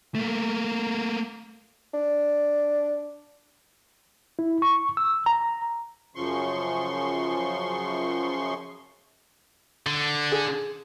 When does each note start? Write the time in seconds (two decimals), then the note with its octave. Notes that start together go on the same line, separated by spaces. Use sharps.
0.15 A3 A#3
1.94 D4
4.39 E4
4.62 C#6
4.97 E6
5.26 A#5
6.15 F#2 C#3 F3 C6 C#6
9.87 D3
10.32 G#4